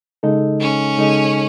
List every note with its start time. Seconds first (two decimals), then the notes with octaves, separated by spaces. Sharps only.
0.23 C#3 G#3 D#4 A4 D#5
0.60 C#4
0.98 C#3 G#3 D#4 A4 D#5